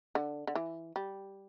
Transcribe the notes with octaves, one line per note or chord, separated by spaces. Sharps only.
D3
D3
E3
G3